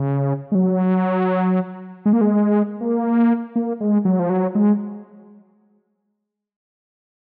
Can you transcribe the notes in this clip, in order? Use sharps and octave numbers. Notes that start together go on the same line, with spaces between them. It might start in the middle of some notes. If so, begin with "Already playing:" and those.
Already playing: C#3
G#3
F#3
G#3
A#3
G#3
A#3
A#3
G#3
F#3
F3
F#3
G#3